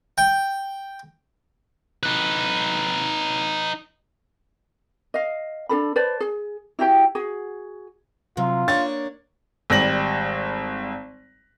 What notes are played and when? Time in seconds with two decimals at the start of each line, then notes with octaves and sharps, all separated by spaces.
0.18 G5
2.03 D#4 B4
5.14 D#5 F5
5.69 D4 G#4 A4 B5
5.96 B4 C5 D5 A5
6.20 G#4
6.79 E4 F#4 G4 G5
7.15 F#4 G#4
8.37 C3 F#3 F4
8.68 A#3 D4 C#5 A6
9.70 G#1 G3 A#6 F#7